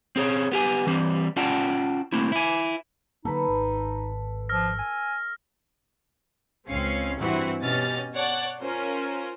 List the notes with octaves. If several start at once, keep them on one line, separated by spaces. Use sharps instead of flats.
C4 G#4 C#5
B3 G4 G#5
E3 G3 C4
C#4 F4 D5 F#5 G5 A5
A3 A#3 C4 E4
E4 G#5
D3 F#3 A#3 D#4 A4 B4
G#1
F3 E6 F6 A#6
G#5
C#2 C4 C#4 F5 C7 C#7
G2 E3 C4 E4 F#4
B2 C#4 G4 D#5 F6 A6
C#5 D5 F#5 A5 F#6 A6
C#4 F4 A#4 C5